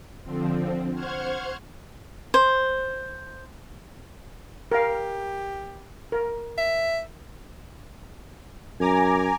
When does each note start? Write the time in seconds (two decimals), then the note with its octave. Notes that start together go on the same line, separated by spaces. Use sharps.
0.23 D3 F3 C4
0.94 C5 F#5 C#6 F6 G#6
2.34 C5
4.72 G4 A#4 F5
6.12 A#4
6.58 E5
8.80 F#2 G#5 A#5 D6